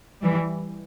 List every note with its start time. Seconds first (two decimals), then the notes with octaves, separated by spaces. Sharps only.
0.22 E3 G3